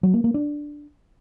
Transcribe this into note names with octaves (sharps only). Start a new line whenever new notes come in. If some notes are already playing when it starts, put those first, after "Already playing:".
F#3
A#3
A#3
D4